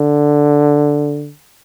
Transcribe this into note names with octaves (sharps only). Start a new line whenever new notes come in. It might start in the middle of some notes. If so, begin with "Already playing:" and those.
Already playing: D3